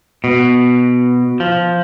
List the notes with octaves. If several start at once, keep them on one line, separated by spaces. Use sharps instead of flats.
B2
F3